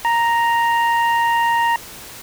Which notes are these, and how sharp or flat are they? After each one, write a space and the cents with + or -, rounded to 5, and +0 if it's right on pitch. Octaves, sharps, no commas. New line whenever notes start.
A#5 +0